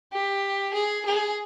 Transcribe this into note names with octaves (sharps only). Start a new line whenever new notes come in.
G4
G#4
G#4